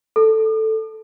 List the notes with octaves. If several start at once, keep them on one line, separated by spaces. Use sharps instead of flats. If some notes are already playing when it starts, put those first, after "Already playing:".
A4